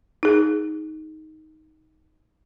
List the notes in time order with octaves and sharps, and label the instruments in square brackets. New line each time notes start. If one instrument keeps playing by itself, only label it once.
[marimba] D#4 G#4